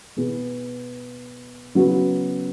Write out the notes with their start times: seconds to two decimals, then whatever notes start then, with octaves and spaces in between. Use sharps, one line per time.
0.16 B2 B3 G#4
1.75 C#3 F#3 B3 F#4